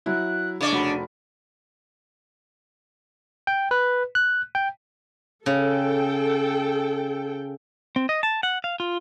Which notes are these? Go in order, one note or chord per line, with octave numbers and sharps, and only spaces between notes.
F#3 E4 F#6
C#3 D4 D5
F1 F#4 B5
G5
B4
F#6
G5
C#3 A4 G5
C4
D#5
A5
F#5
F5
F4